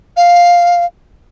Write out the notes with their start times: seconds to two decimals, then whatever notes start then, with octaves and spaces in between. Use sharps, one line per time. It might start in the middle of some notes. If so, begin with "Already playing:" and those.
0.17 F5